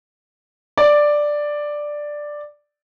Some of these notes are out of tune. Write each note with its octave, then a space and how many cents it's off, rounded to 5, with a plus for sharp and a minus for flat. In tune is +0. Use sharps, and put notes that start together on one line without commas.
D5 +5